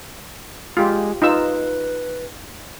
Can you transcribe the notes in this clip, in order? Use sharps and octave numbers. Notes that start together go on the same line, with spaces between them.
G#3 F4 G4
D#4 F4 B4 E6